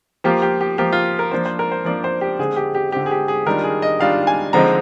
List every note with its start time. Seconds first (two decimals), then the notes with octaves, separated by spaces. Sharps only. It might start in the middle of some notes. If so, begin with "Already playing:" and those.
0.24 F3 A#3 F4 G4
0.42 G4
0.61 G4
0.78 F3 A#3 F4 G4
0.92 F4
1.19 A#4
1.31 F3 A#3 D4 F4 C5
1.46 C5
1.59 A#4
1.72 C5
1.85 F3 A#3 D4 F4 D5
2.04 C5
2.21 G4
2.39 D3 G#3 C4 G#4
2.57 G4
2.75 G4
2.92 D3 G#3 C4 G4
3.06 G#4
3.11 G4
3.28 G#4
3.46 D#3 G3 D4 F4 A#4
3.64 G#4
3.82 D#5
4.00 D#3 G3 D4 F4 F5
4.27 G#5
4.53 D3 F3 G#3 C4 D#4 A#5